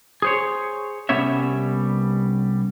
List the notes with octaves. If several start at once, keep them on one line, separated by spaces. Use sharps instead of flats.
G#4 C5 C#5
C2 G3 B3 C#4 C#5 E5